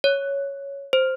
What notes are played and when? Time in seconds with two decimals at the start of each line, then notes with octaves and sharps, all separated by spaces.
0.04 C#5
0.93 C5